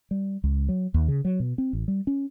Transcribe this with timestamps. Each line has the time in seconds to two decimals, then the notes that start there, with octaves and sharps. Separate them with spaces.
0.11 G3
0.44 C#2
0.69 F#3
0.94 D#2
1.08 C#3
1.25 F#3
1.40 B2
1.58 C4
1.73 A1
1.88 G3
2.07 C#4